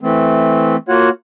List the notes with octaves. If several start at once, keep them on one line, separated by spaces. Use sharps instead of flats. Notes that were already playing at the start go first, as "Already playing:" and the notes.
E3 A3 C4
A#3 F4 F#4 C#5 F#5